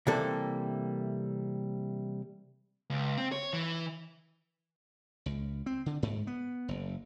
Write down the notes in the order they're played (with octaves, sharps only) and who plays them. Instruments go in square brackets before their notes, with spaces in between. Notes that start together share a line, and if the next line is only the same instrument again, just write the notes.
[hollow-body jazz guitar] C3 E3 G3 A#3 A4
[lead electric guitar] C#2
C4
C#5
E3
[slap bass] C#2
C4
D3
G#2
B3
F#1